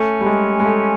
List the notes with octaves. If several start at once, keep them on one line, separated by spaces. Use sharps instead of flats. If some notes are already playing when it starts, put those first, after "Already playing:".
Already playing: A3 C#4
G3
G#3
G#3
A3